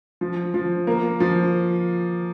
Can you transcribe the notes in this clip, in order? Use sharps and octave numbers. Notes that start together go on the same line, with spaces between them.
F3
F3
A#3
F3